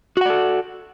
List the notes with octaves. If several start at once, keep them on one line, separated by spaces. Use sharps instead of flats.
F#4 A4 D5 F#5